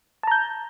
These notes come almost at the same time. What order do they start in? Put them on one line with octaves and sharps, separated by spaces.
A5 A#5 G6